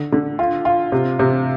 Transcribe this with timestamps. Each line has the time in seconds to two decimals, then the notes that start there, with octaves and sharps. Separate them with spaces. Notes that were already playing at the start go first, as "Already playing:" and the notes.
Already playing: D3
0.13 D3
0.39 F4
0.65 F4
0.92 C3
1.19 C3